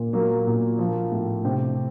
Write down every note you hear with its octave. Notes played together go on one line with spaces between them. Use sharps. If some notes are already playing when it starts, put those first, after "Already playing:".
Already playing: A#2
F#3 A#3
A#2
F3
A2
C3 C4